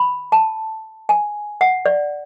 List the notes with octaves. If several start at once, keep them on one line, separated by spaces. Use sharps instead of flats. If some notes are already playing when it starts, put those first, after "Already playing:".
Already playing: B5
A5
G#5
F#5
D5